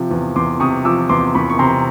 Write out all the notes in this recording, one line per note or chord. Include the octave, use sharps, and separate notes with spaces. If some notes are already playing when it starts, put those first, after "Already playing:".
Already playing: C3 F3
E2
E2 C6 D6
C3 C#6 D#6
F3 D6 E6
E2 C6 D6
E2 B5 C#6
C#6
C3 A#5 C6